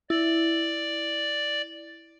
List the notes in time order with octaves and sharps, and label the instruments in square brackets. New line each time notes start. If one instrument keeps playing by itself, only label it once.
[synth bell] E4 [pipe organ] D5